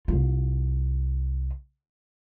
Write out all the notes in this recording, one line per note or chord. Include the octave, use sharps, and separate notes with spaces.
C2 F4